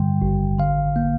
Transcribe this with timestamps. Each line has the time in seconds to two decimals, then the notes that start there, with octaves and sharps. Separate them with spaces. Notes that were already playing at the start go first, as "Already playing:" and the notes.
Already playing: G2 D3 G3 G5
0.22 G#1
0.58 D3 F5
0.96 A#3